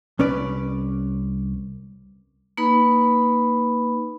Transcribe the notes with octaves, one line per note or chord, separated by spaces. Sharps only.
C2 C#4 B4 D5
A#3 D#4 B4 B5